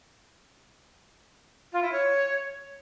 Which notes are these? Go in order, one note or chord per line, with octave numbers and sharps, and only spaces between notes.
F4
E4
C#5